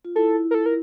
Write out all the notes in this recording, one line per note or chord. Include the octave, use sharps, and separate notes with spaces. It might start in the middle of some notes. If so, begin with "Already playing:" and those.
F4
E4 A4
A#4
A4
A#4